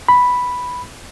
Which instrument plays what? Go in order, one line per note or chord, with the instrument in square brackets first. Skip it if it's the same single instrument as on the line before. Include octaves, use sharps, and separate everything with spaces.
[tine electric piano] B5